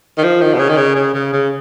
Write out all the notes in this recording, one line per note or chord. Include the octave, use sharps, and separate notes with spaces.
D#3
F3
D#3
B2
C#3
D#3
C#3
C#3
C#3
C#3